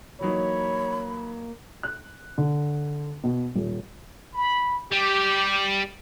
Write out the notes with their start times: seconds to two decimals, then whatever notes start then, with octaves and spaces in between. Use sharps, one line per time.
0.21 E3 F#3 A#3 D#4 C#5 B5
1.83 F#6
2.38 D3
3.24 B2
3.55 D#1
4.34 B5
4.92 G3 G4